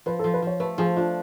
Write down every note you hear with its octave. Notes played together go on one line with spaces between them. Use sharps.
F3 B4
A4
F3
B4
F3 C#5
A3 B4
F3 G#4
D4 F4